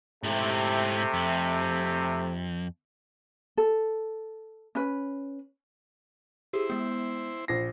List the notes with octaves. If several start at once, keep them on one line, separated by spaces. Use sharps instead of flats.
G#2 C3 A3 E4
F2
A4
C#4 B4
E4 G4 G#4 C5
G#3 B3
A#1 A#6 C7